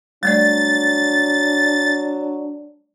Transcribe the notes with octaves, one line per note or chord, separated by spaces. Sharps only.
F#3 G3 A3 D4 D5 A6